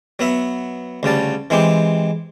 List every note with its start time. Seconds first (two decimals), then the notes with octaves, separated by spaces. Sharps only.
0.19 F#3 B3 E5
1.03 D2 C#3 G3 A5
1.50 E3 G#3 C4 G4